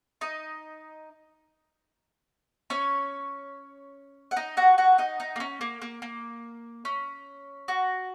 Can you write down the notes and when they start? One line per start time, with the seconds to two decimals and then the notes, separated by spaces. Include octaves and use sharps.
0.21 D#4 D#5
2.70 C#4 C#5
4.31 F#5
4.37 D#4 D#5
4.57 F#4 F#5
4.78 F#4 F#5
4.98 D#4 D#5
5.20 D#4
5.36 A#3
5.40 C#4
5.61 A#3
5.82 A#3
6.02 A#3
6.85 C#4
7.68 F#4